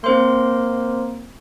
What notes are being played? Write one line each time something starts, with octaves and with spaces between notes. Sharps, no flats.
A#3 C4 C5 C6